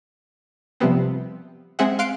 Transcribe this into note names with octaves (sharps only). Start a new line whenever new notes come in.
C3 F3 G3 B3 C4
G#3 C4 G#4 E5 F#5
F5 C6 F#6 C7 D7